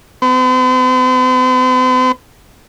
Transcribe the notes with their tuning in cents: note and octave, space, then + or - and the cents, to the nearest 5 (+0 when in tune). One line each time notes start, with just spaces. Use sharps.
C4 -45